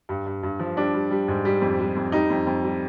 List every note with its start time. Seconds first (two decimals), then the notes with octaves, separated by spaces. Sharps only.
0.09 G2
0.26 G2
0.43 G2
0.60 F3
0.77 G3 D4
0.94 G3
1.11 G3
1.28 G#2
1.45 G3
1.61 F2
1.79 G3
1.96 F2
2.12 G3 D#4
2.30 F2
2.47 F2
2.64 G3